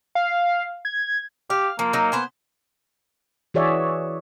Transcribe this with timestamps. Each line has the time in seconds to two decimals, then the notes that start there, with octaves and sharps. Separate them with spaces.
0.15 F5
0.85 G#6
1.50 G4 F5
1.79 F3 A#3
1.93 F#3 D#4
2.12 B3 C5 G#5
3.54 E3 F#4 G#4 C#5 D5 E5